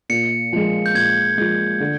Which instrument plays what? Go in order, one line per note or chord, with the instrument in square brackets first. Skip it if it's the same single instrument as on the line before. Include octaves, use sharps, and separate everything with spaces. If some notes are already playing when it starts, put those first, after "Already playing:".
[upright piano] A#2 [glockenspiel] C#7
[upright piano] F3 G#3
[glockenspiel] G6
[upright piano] A#2 [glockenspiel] G#6
[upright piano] F3 G#3
D3